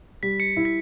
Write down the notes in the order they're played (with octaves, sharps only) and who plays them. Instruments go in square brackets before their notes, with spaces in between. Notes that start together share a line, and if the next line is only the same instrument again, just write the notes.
[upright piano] G3 [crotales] B6
[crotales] C#7
[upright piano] E4
[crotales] B6